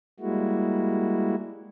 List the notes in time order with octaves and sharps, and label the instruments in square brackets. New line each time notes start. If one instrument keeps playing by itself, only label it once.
[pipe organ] G3 G#3 A#3 E4 F#4